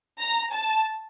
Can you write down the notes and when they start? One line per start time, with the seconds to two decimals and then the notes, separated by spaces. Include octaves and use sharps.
0.20 A#5
0.52 A5